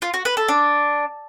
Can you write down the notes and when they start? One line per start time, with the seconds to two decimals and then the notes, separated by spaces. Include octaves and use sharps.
0.02 F4
0.14 F#4
0.25 B4
0.37 A4
0.48 D4